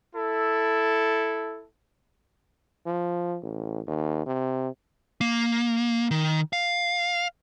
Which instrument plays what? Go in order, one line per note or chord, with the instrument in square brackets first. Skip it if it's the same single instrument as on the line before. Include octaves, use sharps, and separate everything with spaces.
[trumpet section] E4 A4
[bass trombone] F3
A1
D#2
C3
[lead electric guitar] A#3
D#3
F5